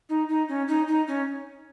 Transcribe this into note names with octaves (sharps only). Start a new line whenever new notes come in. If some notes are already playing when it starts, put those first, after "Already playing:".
D#4
D#4
C#4
D#4
D#4
C#4